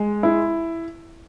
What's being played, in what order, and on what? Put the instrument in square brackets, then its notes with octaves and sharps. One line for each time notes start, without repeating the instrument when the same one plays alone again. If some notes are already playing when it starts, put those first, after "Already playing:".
Already playing: [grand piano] G#3
E4